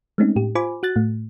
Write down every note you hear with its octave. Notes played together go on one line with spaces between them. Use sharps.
G#3 A3 C4 C#4 D#4
A2 G4
F4 C5 G#5 B5 D6
F#4 F#6 A6
A2 A3